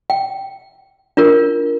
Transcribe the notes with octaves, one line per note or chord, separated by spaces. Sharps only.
G5
D4 F4 A#4